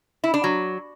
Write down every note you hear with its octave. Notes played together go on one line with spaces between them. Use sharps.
E4
D4
F#3